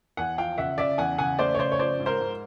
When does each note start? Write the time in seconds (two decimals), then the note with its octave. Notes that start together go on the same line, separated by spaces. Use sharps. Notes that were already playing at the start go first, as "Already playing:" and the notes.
0.17 E2 F#5 G#5
0.37 F3 F5 G5
0.58 C#3 E5 F#5
0.78 C#3 D5 E5
0.98 E2 F#5 G#5
1.18 C#3 F#5 G#5
1.39 A3 C5 D5
1.55 C#5
1.59 C#3 C5 D5
1.72 C#5
1.79 F3 C5 D5
2.00 G#2
2.06 A#4 C5
2.21 G#2